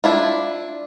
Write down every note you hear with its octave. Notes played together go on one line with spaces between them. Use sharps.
D4 E4 F4